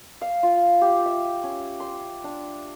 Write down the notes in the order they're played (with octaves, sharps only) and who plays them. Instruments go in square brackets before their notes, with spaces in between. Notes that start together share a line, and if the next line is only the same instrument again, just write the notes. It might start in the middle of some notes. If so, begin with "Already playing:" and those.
[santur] F5
F4
G4
E5
C#4
C6
D4